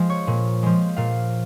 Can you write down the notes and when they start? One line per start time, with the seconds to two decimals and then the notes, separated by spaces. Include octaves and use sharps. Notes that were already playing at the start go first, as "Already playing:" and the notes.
Already playing: F3 G#3
0.10 C#5
0.27 A#2
0.63 F3 G#3
0.97 A#2 F5